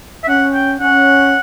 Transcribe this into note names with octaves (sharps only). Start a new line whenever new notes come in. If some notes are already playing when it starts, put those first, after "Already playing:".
E5
C#4 F#5
G5
C#4 F#5